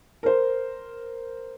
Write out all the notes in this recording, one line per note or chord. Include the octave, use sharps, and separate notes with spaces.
A#4 C5